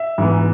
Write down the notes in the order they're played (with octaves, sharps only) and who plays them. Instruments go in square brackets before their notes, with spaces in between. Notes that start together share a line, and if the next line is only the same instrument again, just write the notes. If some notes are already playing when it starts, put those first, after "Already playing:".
Already playing: [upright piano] E5
G#2 E3 B3